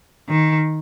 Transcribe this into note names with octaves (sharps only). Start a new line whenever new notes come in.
D#3